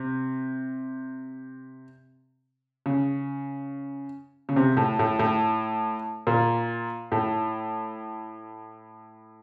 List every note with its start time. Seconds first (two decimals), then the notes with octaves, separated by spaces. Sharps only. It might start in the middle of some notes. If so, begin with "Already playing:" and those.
Already playing: C3
2.86 C#3
4.49 C#3
4.56 C3
4.77 A2
4.99 A2
5.19 A2
6.27 A#2
7.12 A2